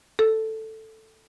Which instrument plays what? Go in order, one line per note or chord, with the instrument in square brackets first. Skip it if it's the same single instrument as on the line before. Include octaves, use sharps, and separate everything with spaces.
[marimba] A4